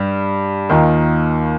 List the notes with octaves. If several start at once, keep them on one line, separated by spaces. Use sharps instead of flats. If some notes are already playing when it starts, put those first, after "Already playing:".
Already playing: G2 G3
D#2 D#3 A#3 F4